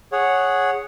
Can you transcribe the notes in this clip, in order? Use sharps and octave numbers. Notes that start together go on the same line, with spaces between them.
G#4 C#5 F#5